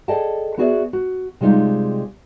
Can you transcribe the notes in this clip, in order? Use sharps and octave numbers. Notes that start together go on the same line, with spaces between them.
G#4 A4 D5 D#5 G5 A5
B3 E4 F#4 G#4 D5 E5
F#4
C3 G3 G#3 D#4 F4